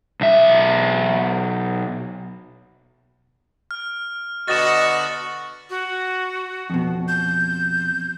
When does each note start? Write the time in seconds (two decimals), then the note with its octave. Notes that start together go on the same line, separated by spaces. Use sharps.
0.21 B1 E5
3.71 F6
4.48 B2 D3 F#4 D#5 A6 E7
5.70 F#4
6.70 F2 B2
7.08 G6